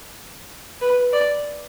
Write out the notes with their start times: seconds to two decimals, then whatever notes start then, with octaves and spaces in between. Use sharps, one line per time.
0.81 B4
1.13 D5